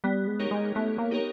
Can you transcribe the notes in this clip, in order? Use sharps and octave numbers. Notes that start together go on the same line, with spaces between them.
G3 B3
G#3
D#4 G4 A#4 C#5
G#3
A3 B3
A#3
D#4 G4 A#4 C#5